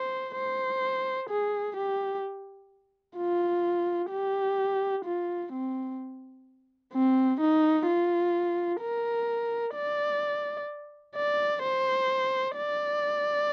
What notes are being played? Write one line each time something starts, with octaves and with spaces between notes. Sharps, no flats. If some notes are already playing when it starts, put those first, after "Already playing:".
Already playing: C5
C5
G#4
G4
F4
G4
F4
C4
C4
D#4
F4
A#4
D5
D5
C5
D5